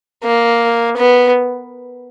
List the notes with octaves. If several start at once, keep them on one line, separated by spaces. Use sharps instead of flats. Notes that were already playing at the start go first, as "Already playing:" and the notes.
A#3
B3